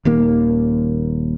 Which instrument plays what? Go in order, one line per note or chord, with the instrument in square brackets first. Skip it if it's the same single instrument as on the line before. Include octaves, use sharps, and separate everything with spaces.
[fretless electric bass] D#1 D#2 A#3